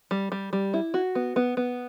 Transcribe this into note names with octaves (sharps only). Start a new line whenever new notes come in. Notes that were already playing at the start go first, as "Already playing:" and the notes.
G3
G3
G3
E4
F#4
B3
B3
B3